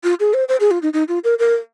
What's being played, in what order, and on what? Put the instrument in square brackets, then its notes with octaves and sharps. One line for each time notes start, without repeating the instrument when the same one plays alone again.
[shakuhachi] F4
G#4
C5
C5
G#4
F4
D#4
D#4
F4
A#4
A#4